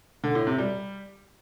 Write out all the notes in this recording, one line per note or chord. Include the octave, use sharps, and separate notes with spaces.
D3
A2
C3
G3